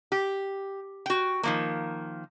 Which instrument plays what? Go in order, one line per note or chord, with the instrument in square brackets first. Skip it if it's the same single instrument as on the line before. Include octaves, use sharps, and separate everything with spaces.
[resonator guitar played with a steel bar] G4
F#4 G5
D#3 F3 A#3